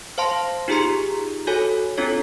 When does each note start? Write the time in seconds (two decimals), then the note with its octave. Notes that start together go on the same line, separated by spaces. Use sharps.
0.18 C5 F5 A5 C6
0.68 D#4 F4 G4 G#4 A#5 C6
1.47 F#4 A4 C#5 G#5
1.98 C4 D4 F4 A4 C#5